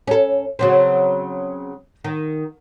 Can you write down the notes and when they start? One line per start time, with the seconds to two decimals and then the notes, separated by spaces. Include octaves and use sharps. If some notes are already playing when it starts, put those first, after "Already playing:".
0.07 C#4 A4
0.59 C#3 F#3 C4
2.04 D#3